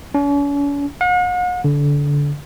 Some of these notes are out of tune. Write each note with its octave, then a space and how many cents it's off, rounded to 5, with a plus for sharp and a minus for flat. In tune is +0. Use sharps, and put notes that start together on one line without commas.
C#4 +45
F#5 -45
D3 -25